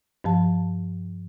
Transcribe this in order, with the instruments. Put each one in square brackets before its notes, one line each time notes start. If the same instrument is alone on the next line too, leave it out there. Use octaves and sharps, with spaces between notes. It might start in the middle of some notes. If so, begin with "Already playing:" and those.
[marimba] G2 F3 A5